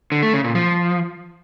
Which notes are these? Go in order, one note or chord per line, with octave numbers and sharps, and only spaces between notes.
D3
A3
C#3
A#2
F3